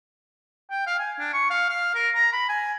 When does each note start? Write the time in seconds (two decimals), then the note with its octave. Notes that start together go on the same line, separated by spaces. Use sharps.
0.71 G5
0.87 F5
0.99 G#5
1.19 D4
1.34 C#6
1.51 F5
1.69 F5
1.95 A#4
2.15 A#5
2.33 B5
2.49 G#5